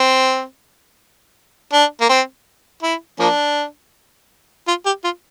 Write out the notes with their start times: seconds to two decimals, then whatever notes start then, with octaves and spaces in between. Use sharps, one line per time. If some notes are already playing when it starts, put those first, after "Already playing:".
Already playing: C4
1.73 D4
2.01 A#3
2.09 C4
2.83 E4
3.19 F3 A#3 D4
4.68 F4
4.86 G4
5.04 F4